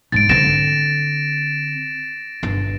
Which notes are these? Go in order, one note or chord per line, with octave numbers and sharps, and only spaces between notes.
G#2 G#3 A6 D7
D3 C4 A6 A#6 E7
G1 D4